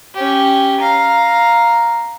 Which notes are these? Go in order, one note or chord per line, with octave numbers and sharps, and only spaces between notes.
C#4 G4
F5 A#5